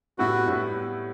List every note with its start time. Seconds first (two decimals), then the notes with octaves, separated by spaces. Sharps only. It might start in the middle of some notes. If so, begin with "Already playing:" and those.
0.19 A2 G3 B3 E4 F#4 B4
0.47 A2 G3 B3 E4 B4